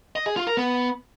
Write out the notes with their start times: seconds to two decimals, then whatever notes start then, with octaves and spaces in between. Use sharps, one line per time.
0.16 D#5
0.26 G#4
0.36 F4
0.47 A#4
0.57 B3